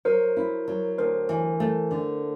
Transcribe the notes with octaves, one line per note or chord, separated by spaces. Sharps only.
F#3 A#4 C5
E4
F#3
D2 A#4 C5
E3
A3
D3